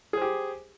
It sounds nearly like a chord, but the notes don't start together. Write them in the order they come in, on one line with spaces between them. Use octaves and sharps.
G#4 C5 G4